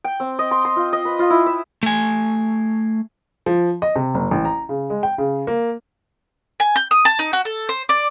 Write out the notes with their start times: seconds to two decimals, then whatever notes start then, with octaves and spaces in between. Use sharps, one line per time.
0.04 G5
0.20 C4
0.39 D#5
0.51 C6
0.65 C6
0.76 F4
0.93 D#5
1.05 B4
1.19 F4
1.30 E4
1.46 E5
1.83 A3 G#5
3.46 F3
3.82 D#5
3.96 C3
4.14 F#1
4.31 A1
4.45 A#5
4.69 C#3
4.90 G#3
5.03 G5
5.18 C#3
5.47 A#3
6.60 G#5
6.76 G6
6.91 D#6
7.05 A5
7.19 D#4
7.33 F#4
7.45 A4
7.69 C5
7.89 D5